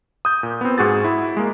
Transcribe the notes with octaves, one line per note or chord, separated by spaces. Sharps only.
D#6 G6
A#2
B3 C4
G#2 F#4 G#4 A6
E4
G#3 A#3